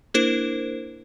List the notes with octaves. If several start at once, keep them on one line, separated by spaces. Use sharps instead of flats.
A#3 D4 E4 A#4 C5